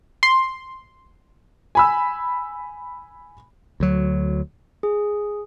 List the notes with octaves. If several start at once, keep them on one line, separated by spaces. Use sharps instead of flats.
C6
G#5 B5 E6
D2 F#3
G#4